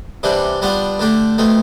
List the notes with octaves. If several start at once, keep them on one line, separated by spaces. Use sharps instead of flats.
C3 E3 G3 D4
G3 B3 D4 F4
D3 A3 D4 G4
B2 A3 C4